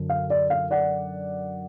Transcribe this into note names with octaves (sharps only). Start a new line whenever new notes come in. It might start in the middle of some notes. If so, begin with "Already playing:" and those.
Already playing: F#2 D3
F5
D5
F5
D5 F#5